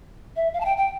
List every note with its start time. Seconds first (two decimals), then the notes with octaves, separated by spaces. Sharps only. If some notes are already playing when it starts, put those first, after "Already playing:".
0.36 E5
0.54 F5
0.61 A5
0.65 G5
0.77 G5